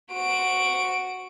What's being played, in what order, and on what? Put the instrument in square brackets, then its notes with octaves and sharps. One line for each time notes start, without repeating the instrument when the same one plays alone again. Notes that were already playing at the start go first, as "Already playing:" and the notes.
[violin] F#4 D7